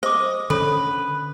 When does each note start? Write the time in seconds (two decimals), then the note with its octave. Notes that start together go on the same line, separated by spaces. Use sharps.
0.03 C5 D#5 D6
0.50 D3 C#4 A4 B4 C#5